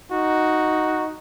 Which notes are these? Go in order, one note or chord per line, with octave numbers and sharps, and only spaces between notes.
D#4 F#4